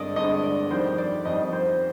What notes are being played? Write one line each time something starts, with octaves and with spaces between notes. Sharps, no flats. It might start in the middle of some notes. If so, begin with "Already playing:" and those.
Already playing: G2 D3 G#3 D5 D#5
G2 D3 G#3 D#5
D5
F2 D#3 G3 C5
D5
F2 D#3 G3 D#5
C5